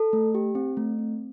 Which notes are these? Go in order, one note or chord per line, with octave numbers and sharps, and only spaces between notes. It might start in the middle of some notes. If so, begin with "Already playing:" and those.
Already playing: A4
A3
G4
C4
A3
C4